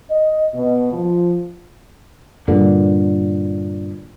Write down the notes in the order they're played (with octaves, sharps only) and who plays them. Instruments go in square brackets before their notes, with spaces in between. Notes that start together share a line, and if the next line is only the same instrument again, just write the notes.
[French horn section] D#5
B2
F3
[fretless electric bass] G2 A#2 D3